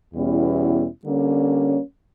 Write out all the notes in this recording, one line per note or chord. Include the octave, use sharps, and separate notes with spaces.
E2 B2 G3 C#4 E4
D3 G3 A#3 C#4